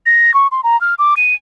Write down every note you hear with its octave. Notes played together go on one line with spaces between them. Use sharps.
A#6
C#6
C6
A#5
F6
D6
D#7